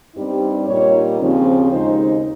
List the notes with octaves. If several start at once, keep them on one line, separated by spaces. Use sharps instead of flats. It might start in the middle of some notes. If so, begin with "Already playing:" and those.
G2 G3 C4 D#4 G4
A#2 G3 A#3 D#4 C#5
D#2 C#3 F3 C4
D#2 C#3 G#3 D#4 C5